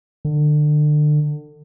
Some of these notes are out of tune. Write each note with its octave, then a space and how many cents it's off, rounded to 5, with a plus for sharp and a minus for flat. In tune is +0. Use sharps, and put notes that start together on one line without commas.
D3 +30